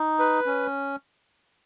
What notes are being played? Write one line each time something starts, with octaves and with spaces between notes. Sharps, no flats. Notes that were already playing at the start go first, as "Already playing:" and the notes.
Already playing: D#4
B4
C#4